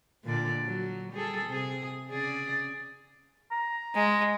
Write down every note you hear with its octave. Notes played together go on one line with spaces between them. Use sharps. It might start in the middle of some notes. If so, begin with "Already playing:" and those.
A#2 D3 D5
F#3
G3 G#4 A4
C3 G#4
C#3 G#4 D5
A#5
G#3